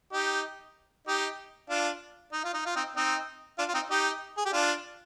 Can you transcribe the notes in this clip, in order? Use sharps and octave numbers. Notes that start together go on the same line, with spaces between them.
D#4 G4
D#4 G4
D4 F4
D#4
F4
D#4
F4
C4 D#4
C4 D#4
D4 F4
F4
C4 D#4
D#4 G4
G#4
G4
D4 F4